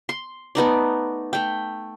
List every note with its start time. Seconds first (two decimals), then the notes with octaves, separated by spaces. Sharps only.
0.09 C6
0.55 A3 B3 D#4 D5
1.33 A3 G5